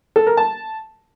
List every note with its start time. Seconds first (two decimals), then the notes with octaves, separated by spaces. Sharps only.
0.16 A4
0.27 A#4
0.37 A5